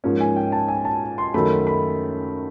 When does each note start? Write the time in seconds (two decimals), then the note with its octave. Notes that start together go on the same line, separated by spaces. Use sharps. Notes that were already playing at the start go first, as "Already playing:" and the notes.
0.04 G#2 F3 A#3 C#4
0.20 G#5
0.36 G5
0.52 A5
0.68 G#5
0.85 A5
1.18 C6
1.34 F#2 D#3 F#3 A3 B5
1.67 B5